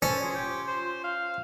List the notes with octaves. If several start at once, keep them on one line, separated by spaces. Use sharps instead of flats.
C#4 A4 C5
F4 G#4
F4 G4
C5
F5